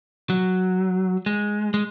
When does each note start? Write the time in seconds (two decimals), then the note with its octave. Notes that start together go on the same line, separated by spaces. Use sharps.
0.30 F#3
1.26 G#3
1.74 G#3